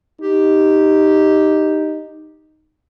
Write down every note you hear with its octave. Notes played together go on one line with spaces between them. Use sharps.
D#4 G4